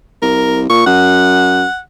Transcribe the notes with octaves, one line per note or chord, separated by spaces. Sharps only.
C2 A#4
A#2 C#6
F#2 F#5